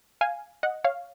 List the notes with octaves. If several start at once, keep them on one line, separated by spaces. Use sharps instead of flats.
F5 G#5
D#5 F#5
C#5 F5